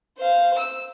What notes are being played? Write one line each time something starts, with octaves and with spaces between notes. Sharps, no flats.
C5 F5
E6